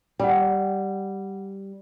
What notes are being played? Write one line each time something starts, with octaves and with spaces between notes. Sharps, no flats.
G3 F#5 G5